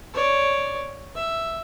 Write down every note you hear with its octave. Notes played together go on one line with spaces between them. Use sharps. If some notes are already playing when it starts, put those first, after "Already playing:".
C#5 D5
E5